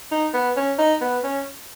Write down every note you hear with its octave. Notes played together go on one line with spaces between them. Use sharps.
D#4
B3
C#4
D#4
B3
C#4